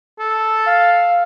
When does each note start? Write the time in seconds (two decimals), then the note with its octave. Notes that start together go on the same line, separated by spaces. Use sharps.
0.19 A4
0.67 F5